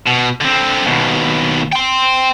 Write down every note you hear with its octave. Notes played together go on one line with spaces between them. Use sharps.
B2
D3 C4
D#2 B2
G5 C6